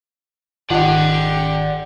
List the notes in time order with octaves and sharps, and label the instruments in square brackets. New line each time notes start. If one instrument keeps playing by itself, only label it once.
[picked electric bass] G#1 D#3 [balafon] F4 D#5 [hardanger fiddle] G4 [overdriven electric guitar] D5 F#5